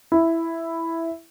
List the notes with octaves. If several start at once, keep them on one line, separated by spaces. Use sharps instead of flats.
E4